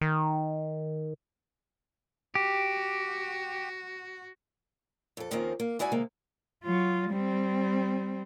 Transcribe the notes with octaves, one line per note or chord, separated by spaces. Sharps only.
D#3
F#4 G4
F2 A4
D#2 D#3 F3 A#3 C4 C#4
A#3
G#3 E4 F#4 D5 G#5
C3 D#3 G#3 A#3
F#3 F4
G3 C4